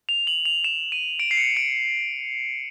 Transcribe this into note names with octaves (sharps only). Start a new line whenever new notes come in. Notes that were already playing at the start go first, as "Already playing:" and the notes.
F7
F#7
F7
E7
D#7
D7
C7
C#7
D7